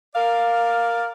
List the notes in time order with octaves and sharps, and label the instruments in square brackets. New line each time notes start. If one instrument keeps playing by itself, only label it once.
[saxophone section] A#4 D5 F5